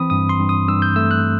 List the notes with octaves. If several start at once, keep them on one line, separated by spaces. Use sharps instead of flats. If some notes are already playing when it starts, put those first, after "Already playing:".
Already playing: E3 C4 B5 D#6
G2 D#6
C6
G2
D#6
G2 E6
G6
A3 E6
F#6